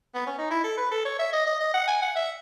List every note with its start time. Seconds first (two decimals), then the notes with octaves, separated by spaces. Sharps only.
0.14 B3
0.27 C#4
0.38 D#4
0.50 E4
0.64 A4
0.78 B4
0.91 A4
1.05 C#5
1.19 E5
1.33 D#5
1.46 D#5
1.60 D#5
1.74 F#5
1.88 G#5
2.02 F#5
2.16 E5